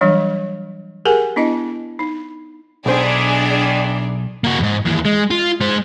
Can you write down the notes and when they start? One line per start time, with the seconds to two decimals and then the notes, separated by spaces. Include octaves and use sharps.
0.01 E3 F#3 G3 D4
1.05 G4 G#4 A#4 F#5 G#5
1.36 B3 D4 E4 D#5
1.99 D#4
2.86 B1 D#3 E3 D4 G#4 C5 D5
4.44 A#3 F#4
4.59 E2 G#2
4.86 D#2 E3
5.05 G#3
5.31 F4
5.61 G#3 C5